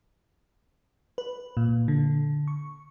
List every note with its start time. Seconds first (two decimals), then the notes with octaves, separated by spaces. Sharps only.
1.18 B4
1.57 A#2
1.88 D3
2.48 C#6